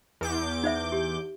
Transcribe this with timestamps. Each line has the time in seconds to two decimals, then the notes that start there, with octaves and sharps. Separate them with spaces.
0.21 E2 D6 G6
0.64 D#4 C5 E5
0.92 G4